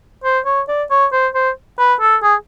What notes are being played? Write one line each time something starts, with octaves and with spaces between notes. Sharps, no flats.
C5
C#5
D5
C#5
C5
C5
B4
A4
G#4